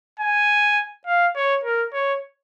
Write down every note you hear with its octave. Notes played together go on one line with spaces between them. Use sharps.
G#5
F5
C#5
A#4
C#5